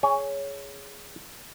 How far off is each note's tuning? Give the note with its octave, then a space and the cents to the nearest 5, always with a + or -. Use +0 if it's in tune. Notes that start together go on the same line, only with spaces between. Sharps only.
G#4 +0 C#5 +10 G#5 -15